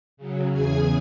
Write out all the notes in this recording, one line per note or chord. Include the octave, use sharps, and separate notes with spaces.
C#3 F#3
E2 C#3 G#4 G#5 G#6